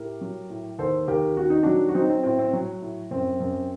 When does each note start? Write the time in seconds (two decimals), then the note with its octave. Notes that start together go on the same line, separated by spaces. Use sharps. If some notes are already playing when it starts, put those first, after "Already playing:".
Already playing: A2 G4 A#4
0.21 F#3
0.50 A2
0.79 D#2 A4 C5
1.08 D#2 G4 A#4
1.37 D#3 F#4
1.50 D#4
1.63 F#3 D4 F#4
1.89 F#4
1.95 F#3 C4 D#4
2.09 C4
2.23 A2 C4
2.39 C4
2.53 F#3
2.82 A2
3.11 F#2 C4
3.40 F#2